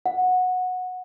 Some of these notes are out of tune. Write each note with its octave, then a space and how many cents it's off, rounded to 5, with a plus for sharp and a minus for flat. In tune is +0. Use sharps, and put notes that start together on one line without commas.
F#5 -15